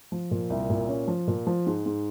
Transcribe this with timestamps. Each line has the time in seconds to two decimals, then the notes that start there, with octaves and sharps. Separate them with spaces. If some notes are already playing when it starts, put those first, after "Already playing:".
0.12 F3
0.31 A#2
0.50 C2
0.70 A#2
0.89 C#4
1.08 F3
1.28 A#2
1.47 F3
1.66 G#2
1.86 G#2